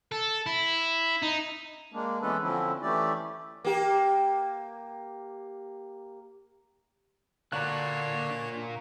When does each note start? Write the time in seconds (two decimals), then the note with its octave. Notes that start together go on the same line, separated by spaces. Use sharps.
0.12 A4
0.46 E4
1.22 D#4
1.93 G#3 A#3 D4
2.22 E3 G#3 B3 C#4 A4 B4
2.42 D3 F3 C4 C#4 E4
2.82 E3 A3 C#4 E4 G4 D5
3.65 A#3 G4
7.52 A#2 D3 A#3 D4 F#4 C#5 F#6